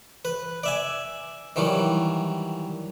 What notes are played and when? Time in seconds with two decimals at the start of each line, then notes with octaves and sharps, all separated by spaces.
0.25 B4
0.63 D5 E5 G#5
1.56 D#3 E3 F#3 G3